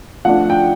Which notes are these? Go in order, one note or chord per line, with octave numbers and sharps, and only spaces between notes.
F3 A3 D4 F#5
G5